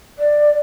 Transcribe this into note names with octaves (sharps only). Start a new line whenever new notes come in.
D5